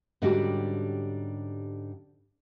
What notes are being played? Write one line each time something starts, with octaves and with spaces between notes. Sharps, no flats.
G#2 D3 G3 C#4 F#4 G4